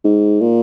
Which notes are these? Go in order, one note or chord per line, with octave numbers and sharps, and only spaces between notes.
G#2
A#2